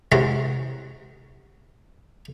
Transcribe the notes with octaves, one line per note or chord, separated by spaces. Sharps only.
C3 E3 F#3 G#3 F#4 A#4